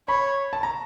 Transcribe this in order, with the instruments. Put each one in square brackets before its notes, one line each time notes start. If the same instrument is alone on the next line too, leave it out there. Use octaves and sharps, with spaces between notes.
[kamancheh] C#5 [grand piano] B5
[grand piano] A5
A#5